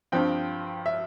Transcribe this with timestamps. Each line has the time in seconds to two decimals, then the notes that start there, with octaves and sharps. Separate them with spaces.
0.12 G2 F3 C4 G5
0.86 E5